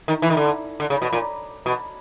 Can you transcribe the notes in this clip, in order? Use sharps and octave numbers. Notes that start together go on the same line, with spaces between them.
D#3
E3
D#3
D3
D3
C#3
B2
A#2
B2